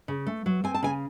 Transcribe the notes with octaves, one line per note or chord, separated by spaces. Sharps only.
C#3
A3
F#3
C4 G#5
A5
C#3 G#5